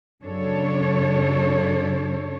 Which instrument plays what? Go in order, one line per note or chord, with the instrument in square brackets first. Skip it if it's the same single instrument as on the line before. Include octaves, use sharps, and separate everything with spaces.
[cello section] F#2 C#3 D4 A4 C#5